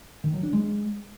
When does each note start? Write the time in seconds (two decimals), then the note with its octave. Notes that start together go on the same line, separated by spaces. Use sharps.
0.24 D#3
0.33 F#3
0.43 D4
0.53 G#3